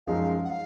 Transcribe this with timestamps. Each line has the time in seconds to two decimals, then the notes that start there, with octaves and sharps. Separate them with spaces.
0.07 F#2 F3 G#3 D#4 F5
0.45 F#5
0.50 F5